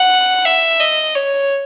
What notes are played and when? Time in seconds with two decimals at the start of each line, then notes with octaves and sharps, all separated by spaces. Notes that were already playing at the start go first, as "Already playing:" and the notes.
Already playing: F#5
0.46 E5
0.80 D#5
1.16 C#5